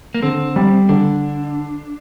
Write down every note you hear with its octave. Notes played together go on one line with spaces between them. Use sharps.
A#3
D3 C4
G3
D3 D4